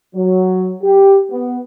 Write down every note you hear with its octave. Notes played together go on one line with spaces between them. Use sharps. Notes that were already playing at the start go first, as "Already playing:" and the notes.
F#3
G4
B3